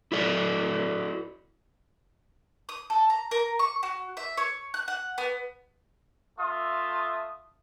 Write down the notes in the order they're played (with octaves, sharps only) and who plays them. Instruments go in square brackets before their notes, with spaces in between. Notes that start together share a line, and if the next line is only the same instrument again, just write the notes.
[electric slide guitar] E4 F#4 A4 D5
[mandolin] D#6
A4
A#5
A#4
C#6
F#4
E5
C#5
F#6
F#5
B3
[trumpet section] A3 F4 E5 D#6